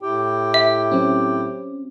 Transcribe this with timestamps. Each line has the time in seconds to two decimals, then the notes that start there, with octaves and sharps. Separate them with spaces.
0.02 A2 E4 G4 G5
0.54 E5
0.91 F#3 C4 C#4